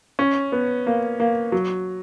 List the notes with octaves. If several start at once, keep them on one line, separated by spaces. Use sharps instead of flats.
C#4
B3
A#3
A#3
F#3